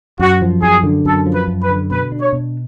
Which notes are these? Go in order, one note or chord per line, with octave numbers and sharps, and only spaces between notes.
F#2 F#4
F3
F#2 G#4
D3
F#2 A4
F3
B4
F#2
B4
D3
B2 B4
D4
C#5
B2